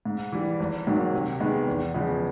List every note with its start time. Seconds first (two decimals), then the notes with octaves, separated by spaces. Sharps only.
0.05 G#2
0.32 E3 G3
0.60 G#1
0.87 G#2 D#3 F#3 A#3
1.13 C3
1.40 D#3 G#3 B3
1.67 E2
1.94 C#3 F3 G#3 B3